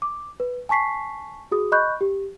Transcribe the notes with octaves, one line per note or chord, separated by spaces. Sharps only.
D6
B4
G#5 A5 C#6 B6 C7
F#4 G#4 D#6
D#5 B5 C#6 F#6 G6
G4